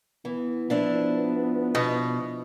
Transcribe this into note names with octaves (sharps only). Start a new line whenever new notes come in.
E3 B3
F3 D4 E4
B2